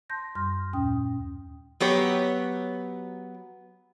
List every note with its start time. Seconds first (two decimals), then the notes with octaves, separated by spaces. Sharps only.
0.10 A5 C6 G6 A#6
0.35 F#2 G3 C6 F6 A#6
0.73 D#2 A#2 C#4 G5 D#6
1.80 F#3 B3 G4 C#5